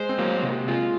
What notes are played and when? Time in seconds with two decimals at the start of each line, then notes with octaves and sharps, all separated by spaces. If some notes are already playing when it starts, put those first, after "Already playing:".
Already playing: G#3 C5
0.09 C4
0.18 F#3 A#3
0.43 C3
0.68 G#3 F4